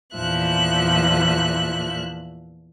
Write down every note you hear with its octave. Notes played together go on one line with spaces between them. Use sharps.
E2 A#2 F3 E5 F#6